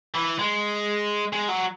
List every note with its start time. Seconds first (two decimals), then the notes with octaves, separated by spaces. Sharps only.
0.15 E3
0.39 G#3
1.33 G#3
1.49 F#3